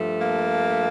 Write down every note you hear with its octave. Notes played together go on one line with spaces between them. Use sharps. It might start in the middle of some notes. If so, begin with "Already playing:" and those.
Already playing: G2 F3 A3
A#3